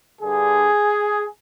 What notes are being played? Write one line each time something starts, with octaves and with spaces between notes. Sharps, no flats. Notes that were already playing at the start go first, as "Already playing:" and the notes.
G2 D3 G#4